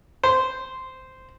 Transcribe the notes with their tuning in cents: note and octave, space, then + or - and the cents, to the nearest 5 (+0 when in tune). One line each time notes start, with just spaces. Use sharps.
C5 -10